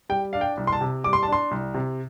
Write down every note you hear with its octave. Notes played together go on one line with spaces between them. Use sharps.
G3 G5
D4 F5
G5
C2
C6
A5
C3
G3 D6
C6
D4 A5
C6
C2
C3